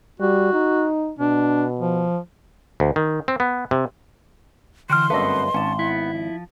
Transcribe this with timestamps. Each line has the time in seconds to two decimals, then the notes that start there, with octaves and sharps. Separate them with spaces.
0.20 G3 F#4
0.53 D#4
1.19 B2 D4
1.80 F3
2.80 D2
2.96 D#3
3.28 C4
3.40 B3
3.71 C3
4.90 D3 E3 F#4 G5 C6 F6
5.10 G1 F#2 A3 B3 C4 B4 D#5
5.54 G#1 C#4 A5
5.79 B3 E4
6.15 F3